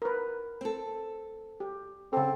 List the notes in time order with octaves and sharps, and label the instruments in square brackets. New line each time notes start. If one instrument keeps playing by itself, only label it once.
[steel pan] A#4 B4
[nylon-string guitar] C4 A4
[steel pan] G4
[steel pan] C#3 A4 [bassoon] C4